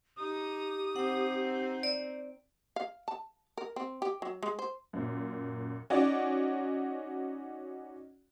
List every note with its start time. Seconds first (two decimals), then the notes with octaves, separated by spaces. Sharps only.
0.18 D#4 G4 D#6
0.96 C4 D#4 F#5
1.83 D5
2.76 F5
3.08 A5
3.57 A#4
3.76 C4
4.02 G4
4.22 F#3
4.43 G#3
4.59 C5
4.93 F#2 A#2
5.90 C#4 D#4 F#4 D5